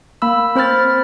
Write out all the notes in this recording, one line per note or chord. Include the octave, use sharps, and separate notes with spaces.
A#3 B5 E6
C4 C5 B5 F6 A6